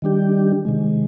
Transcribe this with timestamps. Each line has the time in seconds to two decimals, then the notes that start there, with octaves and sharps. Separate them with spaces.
0.02 D#3 G3 D4 G4
0.65 C3 D#3 G#3